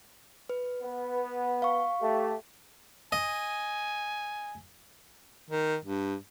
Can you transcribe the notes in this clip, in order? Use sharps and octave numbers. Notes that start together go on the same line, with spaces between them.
B4
B3
F5 C#6
A3 G4
D#5 G#5
D#3
G2